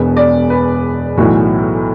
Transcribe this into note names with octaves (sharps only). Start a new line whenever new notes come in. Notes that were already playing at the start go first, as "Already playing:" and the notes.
Already playing: E1 E2 B2 B4
D5
B4
B1 A2 E3 F#4